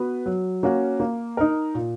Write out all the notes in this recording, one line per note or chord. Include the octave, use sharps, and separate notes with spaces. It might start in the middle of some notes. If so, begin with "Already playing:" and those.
Already playing: B3 F#4 B4
F#3
A#3 C#4 F#4
A#3
D#4 A#4
A#2